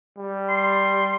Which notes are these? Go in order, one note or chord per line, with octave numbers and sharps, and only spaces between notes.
G3
C6